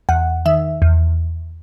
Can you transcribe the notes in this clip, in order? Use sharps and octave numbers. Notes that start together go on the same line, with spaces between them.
E2 F#5
D#3 E5
E2